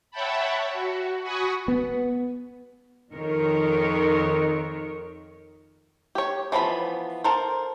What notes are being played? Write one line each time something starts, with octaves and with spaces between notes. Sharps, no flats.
C#5 E5 F#5 G5 A5 B5
F#4
F#4 F#5 G#5 B5 C#6 D#6
B3
F2 D#3 A#4 C#5
G4 C#5
E3 F3 B3 B5
A4 A#4 C5